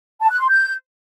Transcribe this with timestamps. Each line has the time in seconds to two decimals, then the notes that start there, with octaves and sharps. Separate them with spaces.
0.22 A5
0.31 F#6
0.40 C6
0.49 G6